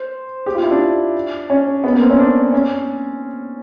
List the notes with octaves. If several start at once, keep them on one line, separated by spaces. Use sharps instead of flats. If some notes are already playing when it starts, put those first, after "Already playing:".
Already playing: C5
G4
F4
E4
D4
C#4
B3
A#3
C4
C#4
D4
C#4